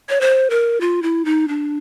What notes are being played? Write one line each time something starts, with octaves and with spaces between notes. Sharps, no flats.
C#5
C5
A#4
F4
E4
D#4
D4